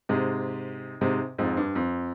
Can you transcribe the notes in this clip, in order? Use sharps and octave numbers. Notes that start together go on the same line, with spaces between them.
G#2 C3
G#2 C3
F2 G#2
G2
F2